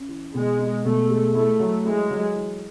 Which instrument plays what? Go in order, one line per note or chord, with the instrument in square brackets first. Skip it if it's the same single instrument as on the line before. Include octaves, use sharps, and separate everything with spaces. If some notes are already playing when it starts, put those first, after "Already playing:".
Already playing: [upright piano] C#4
E3
[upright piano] B2 [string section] G#3
[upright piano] D#4
[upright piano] B2 [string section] A3
[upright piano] G#3
[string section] A3 [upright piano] E4
[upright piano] F#3
[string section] G#3 [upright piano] E4
[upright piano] F#3
E3